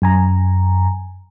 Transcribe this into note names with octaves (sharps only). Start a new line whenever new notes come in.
F#2 G#5 A#5